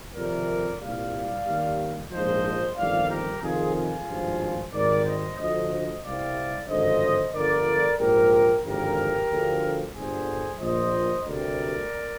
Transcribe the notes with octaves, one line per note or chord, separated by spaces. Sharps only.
F2 C3 D#3 A#4 D5
C2 A#2 G3 D5 F5
D#2 D#3 G3
A#1 G#2 F3 C5 D#5
G1 F2 D#3 G3 D5 F5
G4 A#4
F2 C3 D#3 F4 G#4
F4 G#4
G#1 G2 F3
G#1 G#2 D#3 G3 A#4 D5
C5 D#5
D2 D3 F3 C5 D#5
C2 C3 G3 D5 F5
G#1 G2 D3 F3 C5 D#5
G1 G2 D3 F3 A#4 D5
A#1 G#2 F3 G4 A#4
G#1 G2 D3 F3 G4 A#4
D2 D3 F3
G1 G2 D3 G#4 C5
A#1 A#2 F3 C5 D#5
D2 C3 G3 A#4 D5